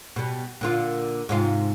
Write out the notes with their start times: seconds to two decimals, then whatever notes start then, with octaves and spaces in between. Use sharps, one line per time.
0.16 B2 G3
0.61 A#2 D3 F4
1.29 G#2 C3 F4